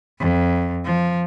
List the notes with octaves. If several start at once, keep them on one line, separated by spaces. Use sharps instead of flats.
F2
F3